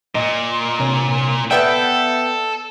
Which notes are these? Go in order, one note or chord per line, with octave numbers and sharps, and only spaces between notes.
A#2 D#5
C2 C3 C#5
B3 A4 D5 E5 G5